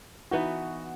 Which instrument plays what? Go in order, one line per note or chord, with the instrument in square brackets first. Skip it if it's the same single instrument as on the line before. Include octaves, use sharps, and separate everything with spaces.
[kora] E3 B3 D#4 [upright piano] F#4